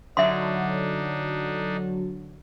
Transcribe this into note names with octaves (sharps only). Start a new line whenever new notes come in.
D3 F#3 D4 D#4 E5 C6